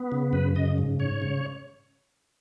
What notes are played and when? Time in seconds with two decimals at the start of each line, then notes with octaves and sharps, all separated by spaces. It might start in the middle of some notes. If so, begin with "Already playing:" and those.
Already playing: B3
0.12 C#3
0.33 F#2 B4
0.55 C#3 D#5
0.78 G#2
0.99 G#2 C#5
1.22 C#3